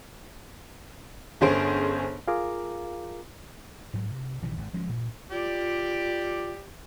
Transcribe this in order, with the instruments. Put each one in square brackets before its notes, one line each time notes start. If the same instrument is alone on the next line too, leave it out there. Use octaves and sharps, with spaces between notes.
[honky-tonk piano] G1 D3 C#4 G#4 C5 D7
[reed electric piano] F4 G#4 A#4 F5 A#5 D6
[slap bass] G#2 F#3 G#3
C3
A#1 C3 D#3 E3
G#1 G#2
D2 F3 G#3 C#4
G2 A#2
[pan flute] F4 [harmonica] G4 D5